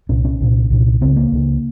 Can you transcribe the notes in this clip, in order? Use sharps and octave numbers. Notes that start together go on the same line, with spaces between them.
C2 A#2 C#4
C#4
C2 A#2
C2 A#2
C#2 C#3 C4
A#3
C#2 C#3